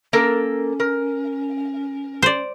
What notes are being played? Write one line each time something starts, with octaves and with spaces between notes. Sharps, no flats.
A#3 C#4 A4 A#4
A#4
C5 D5